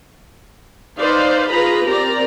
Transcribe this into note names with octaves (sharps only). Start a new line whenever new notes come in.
D#4 B4 C5 D5 F5
F4 G#4 B4 A#5 B5
C4 G4 A#4 D5 A#5